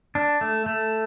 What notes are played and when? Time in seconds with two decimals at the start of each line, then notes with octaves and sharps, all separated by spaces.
0.15 D4
0.41 A3
0.66 A3